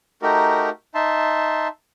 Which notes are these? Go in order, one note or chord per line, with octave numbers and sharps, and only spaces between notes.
A3 D#4 F#4 G4 A#4
D#4 E5 A5 C6